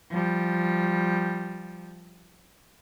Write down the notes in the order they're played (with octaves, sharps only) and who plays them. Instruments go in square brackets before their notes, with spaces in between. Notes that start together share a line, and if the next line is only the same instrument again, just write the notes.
[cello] F3 G3